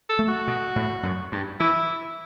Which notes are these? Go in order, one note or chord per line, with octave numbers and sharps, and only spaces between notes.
A4
A3
F#4
B2
A2
F#2
G2
E3 E4